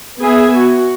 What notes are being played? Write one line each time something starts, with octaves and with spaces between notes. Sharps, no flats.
B3 G#4 E5 G#5
F#4